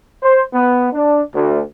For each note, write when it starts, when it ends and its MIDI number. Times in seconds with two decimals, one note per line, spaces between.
0.23 0.42 72
0.52 0.88 59
0.94 1.21 62
1.34 1.60 38